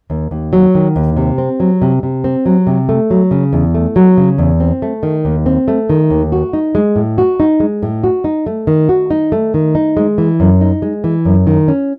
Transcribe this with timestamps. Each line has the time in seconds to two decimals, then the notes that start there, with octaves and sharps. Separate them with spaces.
0.10 D#2
0.31 D#2
0.53 F#3
0.75 D#3
0.96 D#2
1.17 C3
1.38 C4
1.60 F#3
1.82 C3
2.03 C3
2.24 C4
2.46 F#3
2.67 C3
2.89 A3
3.10 F#3
3.31 C#3
3.53 E2
3.75 A3
3.96 F#3
4.17 C#3
4.38 E2
4.60 C4
4.82 A3
5.03 D#3
5.25 D#2
5.46 C4
5.68 A3
5.90 D#3
6.10 D#2
6.32 F#4
6.53 D#4
6.75 G#3
6.96 A2
7.18 F#4
7.40 D#4
7.60 G#3
7.83 A2
8.04 F#4
8.24 D#4
8.47 A3
8.67 D#3
8.89 F#4
9.11 D#4
9.32 A3
9.54 D#3
9.75 D#4
9.97 G#3
10.18 E3
10.40 F#2
10.61 D#4
10.82 G#3
11.04 E3
11.25 F#2
11.47 D#3
11.68 C#4